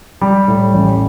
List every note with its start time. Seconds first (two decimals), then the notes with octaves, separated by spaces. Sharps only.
0.21 G3
0.48 A2
0.74 A1